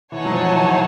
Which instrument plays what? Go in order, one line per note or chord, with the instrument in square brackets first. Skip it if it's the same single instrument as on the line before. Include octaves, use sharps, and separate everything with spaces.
[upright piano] E3 [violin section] D#4 G#4 C#5 F#5 A5
[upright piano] F#3
F3
E3
E3